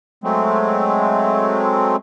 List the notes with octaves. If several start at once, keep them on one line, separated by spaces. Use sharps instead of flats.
F#3 G#3 A3 C4